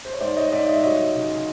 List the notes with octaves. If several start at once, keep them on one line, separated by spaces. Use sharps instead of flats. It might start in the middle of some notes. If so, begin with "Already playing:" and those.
C5
C#5
G#2 C5 D5
C#5 D#5
G#2 D5 E5
D#5
E5
F#3 C#5 D#5
C#3